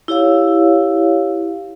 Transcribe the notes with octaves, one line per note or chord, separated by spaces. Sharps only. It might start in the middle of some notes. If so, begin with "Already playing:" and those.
E4 G4 C#5 F5